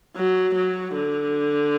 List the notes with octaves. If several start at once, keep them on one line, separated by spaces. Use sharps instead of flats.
F#3
F#3
D3